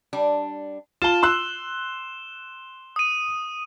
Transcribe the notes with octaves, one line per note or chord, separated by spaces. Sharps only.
G3 D4
F4 A5 E7 G7
C6 E6 F#6
D#6 D#7